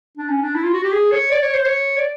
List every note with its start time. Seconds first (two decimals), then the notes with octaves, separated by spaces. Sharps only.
0.17 D4
0.29 C#4
0.42 D4
0.55 E4
0.64 F4
0.73 F#4
0.83 G4
0.92 G#4
1.12 C#5
1.31 D5
1.42 C#5
1.54 C5
1.66 C#5
1.98 D5